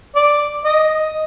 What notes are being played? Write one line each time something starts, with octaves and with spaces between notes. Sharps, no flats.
D5
D#5